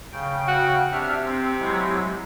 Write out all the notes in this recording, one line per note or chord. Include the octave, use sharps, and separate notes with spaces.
C#3 G5
F#4
C3 D4 E5 F6
C4
F#3 G#3 E4